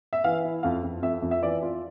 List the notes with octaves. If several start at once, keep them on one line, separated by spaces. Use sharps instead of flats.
E5
E3 F5
E4
F2 F5
F2
F2 E5
F2
E5
E3 D5
F4